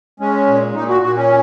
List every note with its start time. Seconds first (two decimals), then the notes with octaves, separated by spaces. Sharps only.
0.20 G#3 C#4
0.47 A#2
0.75 A#2 D#4
0.89 F#4
1.02 A#2 F#4
1.16 C#4